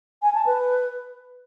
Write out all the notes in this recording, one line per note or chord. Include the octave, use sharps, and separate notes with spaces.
G#5
A5
B4